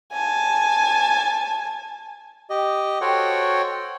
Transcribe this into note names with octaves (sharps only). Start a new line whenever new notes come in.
G#5 A5
G4 D#5
F#4 A4 C5 C#5 F#5 G5